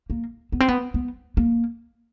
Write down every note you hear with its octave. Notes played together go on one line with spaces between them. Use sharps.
A#3
B3
C4
B3
B3
A#3